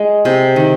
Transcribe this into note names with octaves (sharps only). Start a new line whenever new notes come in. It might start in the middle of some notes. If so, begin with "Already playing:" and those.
Already playing: G#3
C3
D#3